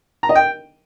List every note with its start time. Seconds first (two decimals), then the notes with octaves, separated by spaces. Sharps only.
0.23 A#5
0.29 D#5
0.35 G5